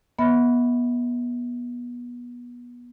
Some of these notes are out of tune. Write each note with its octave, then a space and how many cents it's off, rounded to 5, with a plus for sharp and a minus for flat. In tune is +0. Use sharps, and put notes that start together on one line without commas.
B3 -25 E5 -35 B5 +0